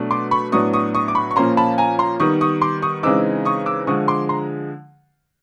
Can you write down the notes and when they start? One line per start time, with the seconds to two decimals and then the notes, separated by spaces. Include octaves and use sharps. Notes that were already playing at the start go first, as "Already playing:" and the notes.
Already playing: B2 F#3 A3 D4
0.11 C6 D6
0.31 B5 C#6
0.52 A2 F#3 B3 D4 C#6 D#6
0.73 C#6 D#6
0.95 C#6 D#6
1.08 D6
1.15 B5 C#6
1.31 C#6
1.36 A#2 F3 A#3 C#4 A#5 C6
1.57 A5 B5
1.78 G#5 A#5
1.99 A#5 C6
2.20 D#3 G3 B3 C#6 D#6
2.41 C#6 D#6
2.62 C6 D6
2.82 C#6 D#6
3.03 C#3 E3 G#3 C4 D#4 D6 E6
3.45 C#6 D#6
3.66 D6 E6
3.87 D3 F3 G#3 C#6 D#6
4.08 C6 D6
4.29 A#5 C6